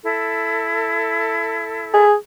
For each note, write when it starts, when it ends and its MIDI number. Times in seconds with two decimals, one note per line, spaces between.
0.04 2.06 64
0.04 2.06 69
1.94 2.14 68